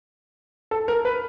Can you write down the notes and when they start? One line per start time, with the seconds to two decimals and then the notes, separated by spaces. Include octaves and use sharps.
0.71 A4
0.88 A#4
1.05 B4